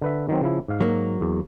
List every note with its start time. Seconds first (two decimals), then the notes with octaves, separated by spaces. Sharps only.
0.01 D3 B4 E5
0.29 D#3 F#3 C4
0.41 C#3 F3 E4
0.68 G#2 F5
0.81 F#3 A#3
1.21 E2